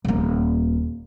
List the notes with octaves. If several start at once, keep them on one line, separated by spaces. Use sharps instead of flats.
D#1 A#3